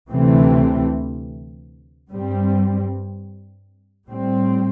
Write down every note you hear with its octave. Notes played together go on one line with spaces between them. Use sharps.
D2 C3 E3 A3 C4
G2 G3 C4
A2 G3 C4